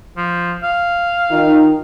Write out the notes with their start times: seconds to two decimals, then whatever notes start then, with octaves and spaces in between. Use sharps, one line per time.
0.17 F3
0.63 F5
1.31 D#3 D#4 F4